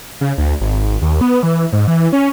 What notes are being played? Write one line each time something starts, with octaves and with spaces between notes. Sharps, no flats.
C#3
D2
G#1
D#2
B3
E3
G#2
E3
C#4